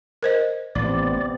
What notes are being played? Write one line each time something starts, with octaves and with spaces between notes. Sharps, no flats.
A#4 C5 D#5
A1 C3 B3 D5